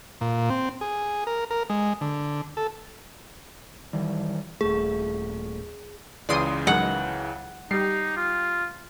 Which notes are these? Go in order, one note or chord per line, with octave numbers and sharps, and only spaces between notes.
A#2
C4
G#4
A#4
A#4
G#3
D3
A4
D#3 E3 G3
D#1 A3 G#4
C#2 C#3 E3 D5 C6 D#6
F#3 G#3 D#4 F#5
G3 D#4 G4 C7
F4